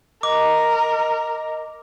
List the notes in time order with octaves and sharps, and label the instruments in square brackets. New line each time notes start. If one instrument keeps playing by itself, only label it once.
[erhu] A#4 [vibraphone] D#5 [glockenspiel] D6